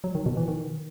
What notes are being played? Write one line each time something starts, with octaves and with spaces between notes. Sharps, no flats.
F#3
D#3
B2
E3
D#3